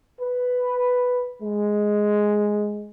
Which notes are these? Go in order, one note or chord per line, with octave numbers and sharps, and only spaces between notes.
B4
G#3